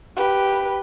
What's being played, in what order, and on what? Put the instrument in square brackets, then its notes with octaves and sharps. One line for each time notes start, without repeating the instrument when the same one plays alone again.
[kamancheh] G4 B4